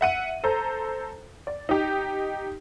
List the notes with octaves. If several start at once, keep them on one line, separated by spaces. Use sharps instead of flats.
E5 F#5 D#7
A4 C5 A#5
D5
D#4 G4